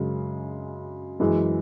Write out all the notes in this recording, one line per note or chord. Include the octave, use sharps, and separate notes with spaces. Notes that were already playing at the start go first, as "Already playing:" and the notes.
Already playing: F#2 C#3 G#3
F#2 E3 G#3